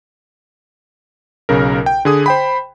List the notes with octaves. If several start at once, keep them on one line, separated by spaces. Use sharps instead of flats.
B1 C#3 A#4
G5
D3 G#4 D#6
C5 G5 B5